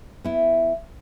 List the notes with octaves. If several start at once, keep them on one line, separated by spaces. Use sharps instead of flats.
B3 E4